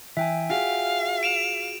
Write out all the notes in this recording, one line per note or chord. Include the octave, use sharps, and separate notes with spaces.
E3 E5 G5 G#5
F4 F#4 G#4 F5
D7 E7 F7